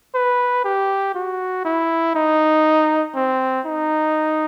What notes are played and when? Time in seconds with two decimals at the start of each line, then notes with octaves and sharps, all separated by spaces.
0.15 B4
0.65 G4
1.15 F#4
1.65 E4
2.15 D#4
3.15 C4
3.66 D#4